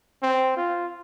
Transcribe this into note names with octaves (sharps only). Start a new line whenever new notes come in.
C4
F4